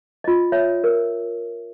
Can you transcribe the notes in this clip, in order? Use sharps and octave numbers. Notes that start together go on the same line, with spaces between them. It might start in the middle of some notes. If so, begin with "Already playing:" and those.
F4 D#5
C#5 E5
A#4